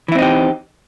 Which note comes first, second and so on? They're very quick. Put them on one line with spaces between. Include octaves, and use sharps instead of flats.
E3 E4 C4 D#4 G4